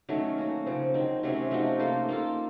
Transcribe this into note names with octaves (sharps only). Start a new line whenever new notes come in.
D#3 F#3 A3 C#4
A#3 C#4 F#4
C#3 F3 C4
D#3 F#3 C4
C3 F#3 A3 C#4
F3 A3 D#4 F#4
A#3 F4 A4
A#3 F4 A4